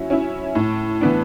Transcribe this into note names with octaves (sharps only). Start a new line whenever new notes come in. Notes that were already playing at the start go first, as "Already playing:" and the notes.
Already playing: F#3 C#4 E4
C#4 E4
A2
E3 B3 D4